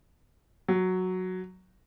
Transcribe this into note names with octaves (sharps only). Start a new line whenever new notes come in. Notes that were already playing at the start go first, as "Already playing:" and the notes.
F#3